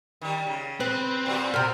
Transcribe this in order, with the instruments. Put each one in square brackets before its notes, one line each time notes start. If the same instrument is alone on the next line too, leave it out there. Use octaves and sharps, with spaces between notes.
[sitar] D#3 G3
C#3
[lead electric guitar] C4 [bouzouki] B4
[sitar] A#2 G3 F#4
[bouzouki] C3 A#4